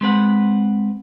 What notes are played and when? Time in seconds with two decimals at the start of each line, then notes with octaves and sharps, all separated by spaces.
0.01 G#3 C4 B4 F#5